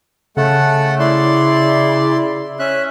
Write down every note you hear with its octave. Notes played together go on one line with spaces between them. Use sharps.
C#3 A3 A4 F#5
E4 D5 C6
C#4 E5 F#6